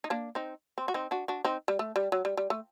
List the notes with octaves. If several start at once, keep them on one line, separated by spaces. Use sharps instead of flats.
D#4
A#3 D4
C4 D#4
C4
F#4
C4 D#4
D4 F#4
D4 F#4
C4 D#4
G3
A3
G3
F#3
G3
G3
A3